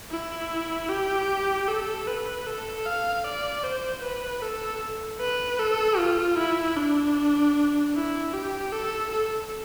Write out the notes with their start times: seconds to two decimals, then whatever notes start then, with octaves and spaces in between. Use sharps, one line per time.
0.11 E4
0.89 G4
1.68 A4
2.07 B4
2.46 A4
2.85 F5
3.24 D5
3.64 C5
4.03 B4
4.42 A4
5.20 B4
5.59 A4
5.98 F4
6.38 E4
6.77 D4
7.95 E4
8.34 G4
8.72 A4
9.11 A4